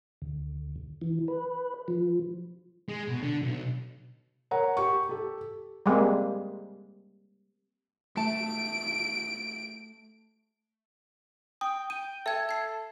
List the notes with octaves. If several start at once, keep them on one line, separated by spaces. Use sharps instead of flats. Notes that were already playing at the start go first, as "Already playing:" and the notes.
D2
E3
B4
F3
G#3
B2
D3
B1
A#4 C#5 F#5 A#5
G4 C#6
G4 A4
G3 G#3 A#3 C4
A3 A5 D7
G5 D#6
G5 D#7
A4 E5 G#6
G#6 C7